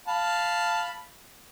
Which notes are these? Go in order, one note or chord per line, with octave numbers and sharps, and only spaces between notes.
F5 A5 B5